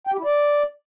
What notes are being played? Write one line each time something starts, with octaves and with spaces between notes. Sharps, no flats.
G5
G4
E4
D5